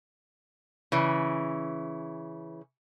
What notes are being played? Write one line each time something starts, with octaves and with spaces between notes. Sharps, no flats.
C#3 E3